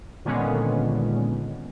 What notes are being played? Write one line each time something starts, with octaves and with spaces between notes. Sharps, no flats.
A#2 D3 D#3 G#3 B3 C#4